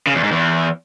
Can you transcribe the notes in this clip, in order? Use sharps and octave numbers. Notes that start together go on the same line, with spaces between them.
C#3
E2
G#2
E2